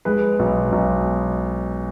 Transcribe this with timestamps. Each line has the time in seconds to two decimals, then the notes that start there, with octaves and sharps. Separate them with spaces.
0.05 G#3 B4
0.39 B1
0.72 B1